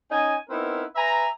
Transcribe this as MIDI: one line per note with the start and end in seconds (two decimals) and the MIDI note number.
0.12 0.37 61
0.12 0.37 63
0.12 0.37 75
0.12 0.37 80
0.50 0.84 59
0.50 0.84 60
0.50 0.84 63
0.50 0.84 64
0.50 0.84 70
0.50 0.84 71
0.96 1.28 71
0.96 1.28 76
0.96 1.28 80
0.96 1.28 82